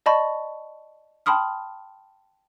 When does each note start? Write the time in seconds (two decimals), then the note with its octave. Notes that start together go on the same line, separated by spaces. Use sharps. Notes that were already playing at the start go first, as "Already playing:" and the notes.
0.06 D5 D#5 A5 B5 C#6
1.26 G5 A5 B5 C6 D#6 F6